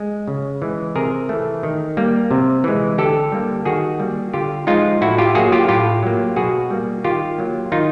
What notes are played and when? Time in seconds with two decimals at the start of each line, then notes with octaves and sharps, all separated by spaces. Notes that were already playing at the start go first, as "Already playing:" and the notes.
Already playing: G#3
0.28 C#3
0.62 E3 G#3
0.95 C3 G#4 A#4
1.29 E3 A3
1.63 D#3
1.97 G3 A#3
2.31 C3
2.64 E3 G#3
2.98 D3 G4 A4
3.32 G3 A#3
3.65 D#3 F#4 G#4
4.00 G3 A#3
4.34 D3 F4 G4
4.67 F3 G#3 D#4 F4
5.01 A2 E4 F#4
5.18 F4 G4
5.35 F#3 A#3 F#4 G#4
5.52 F4 G4
5.68 A2 F4 G4
6.03 F#3 A#3
6.36 B2 F#4 G#4
6.70 G3 A#3
7.04 D#3 F4 G4
7.38 F#3 A#3
7.72 D#3 D#4 F4